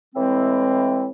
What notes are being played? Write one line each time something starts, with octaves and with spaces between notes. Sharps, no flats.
A2 E3 G#3 C4